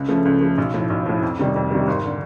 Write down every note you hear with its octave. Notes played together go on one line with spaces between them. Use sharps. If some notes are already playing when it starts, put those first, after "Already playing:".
Already playing: C#2
C#3 F3 A3
C#2
C#3 F3 A3
B1
A2 F3
B1
A2 F3
F2
C3 D#3 G3
F2
C3 D#3 G3
G#1
D3